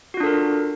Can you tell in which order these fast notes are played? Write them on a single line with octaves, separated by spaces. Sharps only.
F#4 F4 D4 A4 A#4